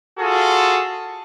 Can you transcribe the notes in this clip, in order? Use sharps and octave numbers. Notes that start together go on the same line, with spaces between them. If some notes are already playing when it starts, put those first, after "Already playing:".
F4 F#4 G#4 A4